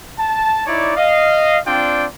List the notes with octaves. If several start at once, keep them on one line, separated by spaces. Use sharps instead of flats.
A5
D#4 E4 C#5 D5
D#5 F5
C4 D4 F4 D5 G5